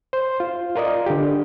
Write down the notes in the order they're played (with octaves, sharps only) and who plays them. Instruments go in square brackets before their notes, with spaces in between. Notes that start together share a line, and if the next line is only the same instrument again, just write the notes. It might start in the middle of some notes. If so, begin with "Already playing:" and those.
[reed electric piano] C5 C6
F4
F4 A#4 D5 D#5
D3 G4